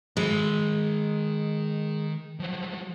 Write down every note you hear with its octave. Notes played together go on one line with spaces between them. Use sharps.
D#3 G#3 B5
F3 F#3